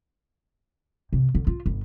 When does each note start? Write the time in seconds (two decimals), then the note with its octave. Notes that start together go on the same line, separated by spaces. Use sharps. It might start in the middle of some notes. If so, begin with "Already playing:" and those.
1.13 C3
1.35 D3
1.47 F4
1.66 G1